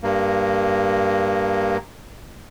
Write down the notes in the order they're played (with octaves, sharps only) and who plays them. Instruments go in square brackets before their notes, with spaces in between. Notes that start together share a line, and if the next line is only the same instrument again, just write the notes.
[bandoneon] G2 A#3